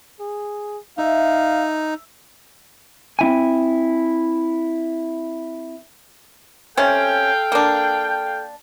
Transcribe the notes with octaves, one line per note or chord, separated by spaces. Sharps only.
G#4
D#4 E5 F5
C4 E4 G#5
C3 C#4 A4 F5 G5
A#3 D4